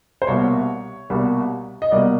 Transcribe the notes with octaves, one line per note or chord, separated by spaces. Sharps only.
C5
C2 B2 G3 A#3 C#5
C2 B2 G3 A#3
D#5
C2 B2 G3 A#3 D5